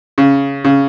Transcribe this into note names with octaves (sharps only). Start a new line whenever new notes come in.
C#3
C#3